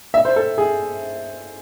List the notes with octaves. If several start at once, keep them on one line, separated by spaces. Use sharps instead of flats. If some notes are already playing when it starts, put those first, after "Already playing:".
E5
C5
A4
G#4